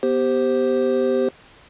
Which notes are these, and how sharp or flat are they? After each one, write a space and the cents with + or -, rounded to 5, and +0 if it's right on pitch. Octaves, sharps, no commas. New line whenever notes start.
B3 +0 G4 +0 C5 +0